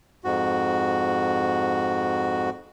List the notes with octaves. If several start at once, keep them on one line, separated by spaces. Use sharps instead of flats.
F2 G#2 F#4